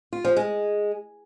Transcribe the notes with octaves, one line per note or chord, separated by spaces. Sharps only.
F4
F3
G#3